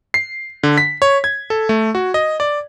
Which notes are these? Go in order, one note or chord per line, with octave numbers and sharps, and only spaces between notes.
C7
D3
B6
C#5
G#6
A4
A3
F#4
D#5
D5